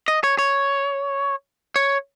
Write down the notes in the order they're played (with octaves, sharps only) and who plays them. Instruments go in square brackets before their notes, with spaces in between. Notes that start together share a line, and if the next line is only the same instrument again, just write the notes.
[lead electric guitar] D#5
C#5
C#5
C#5